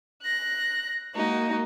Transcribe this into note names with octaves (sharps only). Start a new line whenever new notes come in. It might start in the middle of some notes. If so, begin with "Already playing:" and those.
F#6 A#6
G#3 A#3 D#4 F#4